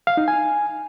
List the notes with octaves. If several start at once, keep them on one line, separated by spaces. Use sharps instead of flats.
F5
D#4
G#5